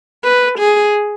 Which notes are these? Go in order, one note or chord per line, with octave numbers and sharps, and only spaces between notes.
B4
G#4